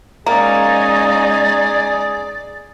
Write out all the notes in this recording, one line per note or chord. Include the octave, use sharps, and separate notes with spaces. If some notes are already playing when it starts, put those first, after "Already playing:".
G#3 A#3 C#4 D#4 G#4 D5